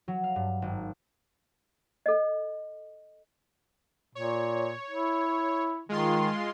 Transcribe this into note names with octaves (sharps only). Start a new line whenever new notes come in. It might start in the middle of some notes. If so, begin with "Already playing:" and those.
F#3
F5
G2
G#1
A4 D#5
A#2 C#5
E4
D#3 G#3 F4 C6